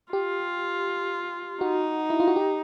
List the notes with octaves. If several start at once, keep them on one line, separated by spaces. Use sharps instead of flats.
F4 G4
D#4 F#4
E4
F4
F#4
G4